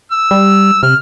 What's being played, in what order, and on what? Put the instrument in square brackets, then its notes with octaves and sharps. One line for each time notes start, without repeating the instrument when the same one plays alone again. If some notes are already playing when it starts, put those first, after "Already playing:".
[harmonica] E6
[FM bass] G3
[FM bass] C3 [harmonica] F6